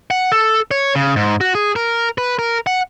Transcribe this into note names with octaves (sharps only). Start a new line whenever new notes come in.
F#5
A4
C#5
C#3
G#2
F#4
G#4
A#4
B4
A#4
F#5